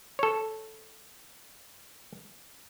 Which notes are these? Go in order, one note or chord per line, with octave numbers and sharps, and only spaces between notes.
A4 C#5